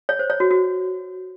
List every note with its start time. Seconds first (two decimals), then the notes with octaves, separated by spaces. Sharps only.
0.09 C#5
0.19 C5
0.30 C#5
0.40 F#4
0.51 F#4